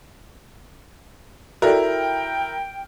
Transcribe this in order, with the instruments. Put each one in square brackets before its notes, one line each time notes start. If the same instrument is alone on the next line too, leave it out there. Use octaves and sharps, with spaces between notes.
[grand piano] E4 A#4 [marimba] F#4 A4 D5 [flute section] G5